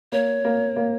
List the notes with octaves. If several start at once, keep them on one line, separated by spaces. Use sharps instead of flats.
A#3 C#5
A#3
A#3